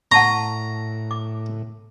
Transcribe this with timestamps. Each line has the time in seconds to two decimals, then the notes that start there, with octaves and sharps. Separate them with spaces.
0.12 A2 F#5 A5 A#5 C#6
1.11 D6